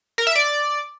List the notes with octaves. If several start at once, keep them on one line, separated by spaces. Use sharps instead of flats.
A#4
E5
D5